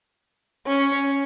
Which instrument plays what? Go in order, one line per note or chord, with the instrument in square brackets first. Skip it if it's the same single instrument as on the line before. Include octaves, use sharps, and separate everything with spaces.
[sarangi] C#4